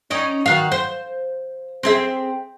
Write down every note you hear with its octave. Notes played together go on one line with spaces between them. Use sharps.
C#4 D#4 D5
D#3 F#4 F5
C5
C4 G#4 E5